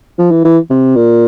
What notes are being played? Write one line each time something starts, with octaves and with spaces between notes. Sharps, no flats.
F3
E3
E3
C3
A#2